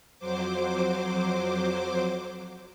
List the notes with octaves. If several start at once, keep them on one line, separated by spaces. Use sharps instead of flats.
F2 F#3 C5 D6